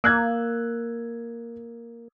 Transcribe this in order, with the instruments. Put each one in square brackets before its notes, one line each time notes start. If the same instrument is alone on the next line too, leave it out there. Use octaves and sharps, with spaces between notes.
[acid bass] A#3 [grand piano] E6 F#6 G#6